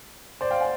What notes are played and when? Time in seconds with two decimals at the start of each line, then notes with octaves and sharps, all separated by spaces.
0.41 C5 D5
0.51 F5 G5
0.61 F#5 G#5